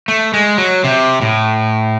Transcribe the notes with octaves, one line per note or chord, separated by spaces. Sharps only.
A3
G#3
F#3
C3
A2